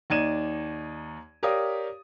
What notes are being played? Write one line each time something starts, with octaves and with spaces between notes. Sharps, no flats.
D#2 D#4 D5 G#6 D#7 E7
G4 A#4 C#5 D5 F5 D#6